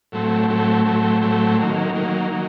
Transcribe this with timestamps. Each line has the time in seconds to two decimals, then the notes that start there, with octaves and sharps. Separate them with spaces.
0.12 A2 F#3 A3 C4
0.48 A2 F#3 A3 C4
0.85 A2 F#3 A3 C4
1.22 A2 F#3 A3 C4
1.58 D#3 F#3 A#3
1.94 D#3 F#3 A#3
2.30 D#3 F#3